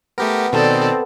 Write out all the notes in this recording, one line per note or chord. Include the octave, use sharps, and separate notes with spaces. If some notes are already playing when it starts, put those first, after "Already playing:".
A3 B3 G4 A#4
B2 D#3 C4 A4 D5